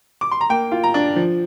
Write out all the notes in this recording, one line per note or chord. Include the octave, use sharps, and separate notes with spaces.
D6
C6
A#5
A#3 G5
F4
A#5
D4
F3